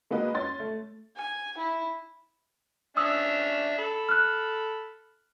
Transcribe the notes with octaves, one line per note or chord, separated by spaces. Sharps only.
G#3 A#3 F#4 B4 D#5
C#4 C6 A6
A3
G#5
E4
C#4 D4 E5 D#6 E6
A4 B5
F6 F#6